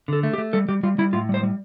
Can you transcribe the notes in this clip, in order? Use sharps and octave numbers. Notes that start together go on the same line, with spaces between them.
D3 A4
A3
G4
A3
G3 A4
G3 G4
G3 F4
G3 E4
A2 F4
G3 C5
G3